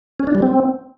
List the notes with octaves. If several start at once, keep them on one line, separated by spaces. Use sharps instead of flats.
C#4
D4
G3
C4